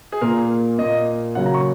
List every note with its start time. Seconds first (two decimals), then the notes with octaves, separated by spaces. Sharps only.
0.12 G#4
0.21 A#2 A#3 A#4
0.78 A#2 A#3 D#5
1.35 C#3 F#3 A#3 F#5
1.46 A#5
1.54 C#6